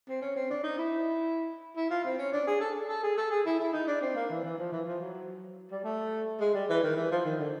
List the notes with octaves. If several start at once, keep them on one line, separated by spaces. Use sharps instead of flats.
C4
C#4
C4
D4
D#4
E4
E4
F4
C4
C#4
D4
G#4
A4
A4
G#4
A4
G#4
E4
E4
D#4
D4
C4
A#3
E3
E3
F3
E3
F3
F#3
G3
A3
G#3
G3
E3
D#3
E3
F3
D#3
D3